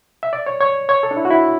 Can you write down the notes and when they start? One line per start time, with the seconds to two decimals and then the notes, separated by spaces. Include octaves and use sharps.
0.23 E5
0.33 D5
0.46 C#5
0.61 C#5
0.89 C#5
1.03 A4
1.11 D4
1.17 E4
1.25 F#4
1.31 E4